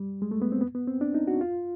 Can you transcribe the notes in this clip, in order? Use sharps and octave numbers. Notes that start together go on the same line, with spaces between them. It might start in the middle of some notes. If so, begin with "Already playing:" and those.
Already playing: G3
G#3
A3
B3
C4
B3
B3
C4
D4
D#4
F#4
F4